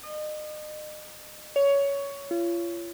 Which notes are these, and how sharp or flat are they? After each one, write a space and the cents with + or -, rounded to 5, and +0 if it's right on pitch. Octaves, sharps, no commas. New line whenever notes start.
D#5 -35
C#5 +15
F4 -35